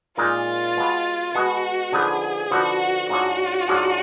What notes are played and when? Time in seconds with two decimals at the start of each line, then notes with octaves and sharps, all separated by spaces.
0.17 A#2 G#3 D#4 F4 A#4
0.77 B2 G#3 B3
1.34 B2 G#3 B3 F#4
1.92 D3 F3 B3 D#4 G#4
2.50 D3 F3 B3 D#4 F#4
3.09 G#2 F#3 D4 F4 F#4 G#4
3.68 G#2 F#3 D4 F4 G#4